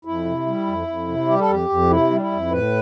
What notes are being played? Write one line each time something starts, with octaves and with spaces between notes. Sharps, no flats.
F2 E4
C3
G3
F2
F2
C3
G3 G4
A4
F2 G4
F2
C3 E4
G3
D4
E4
F2
A2 B4